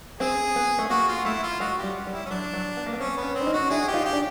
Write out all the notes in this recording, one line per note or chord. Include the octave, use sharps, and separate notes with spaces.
C4 G#4
B3
A3
A#3 F#4
F4
A3 E4
F4
G#3 F#4
G4
G3
G3
E4
C#4
F#3 D4
F#3
B3
A#3
B3
C4 C#4
B3
C#4
C4
D4
C#4 D#4
F#4
D4 E4 G#4
G4
D#4 F4
G4
D4